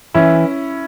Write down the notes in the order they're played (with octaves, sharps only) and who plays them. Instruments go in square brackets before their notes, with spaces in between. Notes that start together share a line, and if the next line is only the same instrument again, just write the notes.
[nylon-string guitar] E3 [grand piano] C#4 E4